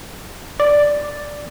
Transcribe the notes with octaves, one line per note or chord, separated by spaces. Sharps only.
D5